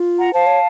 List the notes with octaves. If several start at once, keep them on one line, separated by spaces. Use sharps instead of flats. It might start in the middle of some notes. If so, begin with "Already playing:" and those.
Already playing: F4
F#5 A#5
C5 F5 A5
C#5